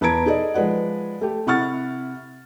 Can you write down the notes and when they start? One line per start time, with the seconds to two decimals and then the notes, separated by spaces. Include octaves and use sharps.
0.01 E2 B4 A5 A#5 G#6 D7
0.26 D#4 G#4 A4 D5 D#5
0.54 F3 G#3 B4 D5 F#5
1.21 A3 G4
1.47 C3 E4 F#5 C#6 F6 A6